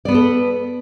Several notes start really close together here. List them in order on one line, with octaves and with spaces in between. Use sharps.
D5 B3 B4 A4